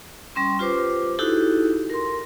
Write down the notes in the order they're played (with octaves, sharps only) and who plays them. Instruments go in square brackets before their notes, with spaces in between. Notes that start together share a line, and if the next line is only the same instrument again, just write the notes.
[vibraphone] G3 C#4 C6
F4 G4 B4 C5 D6
D#4 E4 F#4 G4 A4
A#4 C6